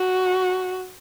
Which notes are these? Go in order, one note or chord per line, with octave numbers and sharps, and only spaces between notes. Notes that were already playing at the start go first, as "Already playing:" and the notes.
Already playing: F#4